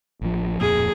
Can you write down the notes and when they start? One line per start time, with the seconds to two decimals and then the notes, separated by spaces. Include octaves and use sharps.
0.21 A1 F3
0.61 D1 F2 A#2 G#4